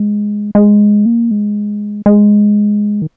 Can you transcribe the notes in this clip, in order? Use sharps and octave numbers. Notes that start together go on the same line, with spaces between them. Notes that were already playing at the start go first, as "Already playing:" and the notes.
Already playing: G#3
G#3
A#3
G#3
G#3
D#3